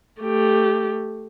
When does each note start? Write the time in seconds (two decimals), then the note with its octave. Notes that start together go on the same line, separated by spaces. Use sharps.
0.21 A3 G4